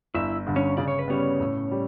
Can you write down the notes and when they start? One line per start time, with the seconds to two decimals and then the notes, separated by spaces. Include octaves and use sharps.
0.14 G1 E4 E5
0.47 G2 D3
0.56 C#4 C#5
0.77 C#3 D5
0.88 C#5
0.99 B4
1.08 G3 B3 C#4 C#5
1.40 A2
1.71 G3